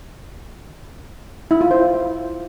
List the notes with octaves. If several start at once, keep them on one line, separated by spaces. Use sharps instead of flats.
E4
F4
C5